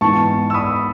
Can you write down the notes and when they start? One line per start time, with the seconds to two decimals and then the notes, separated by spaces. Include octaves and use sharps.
0.01 G#2 E3 B3 A5 C#6
0.50 E6
0.54 B5 D#6